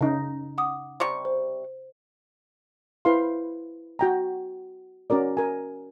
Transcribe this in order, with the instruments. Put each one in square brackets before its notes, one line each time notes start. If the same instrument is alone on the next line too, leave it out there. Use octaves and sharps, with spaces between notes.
[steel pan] C#3 D#4
[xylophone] F#5 D6 D#6
[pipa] C3 G3 C#6
[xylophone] C5
[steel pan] E4 B4 C5 F5 C6
F#4 G5 A#5
C#4 F#4 A#4 D5
A#4 G#5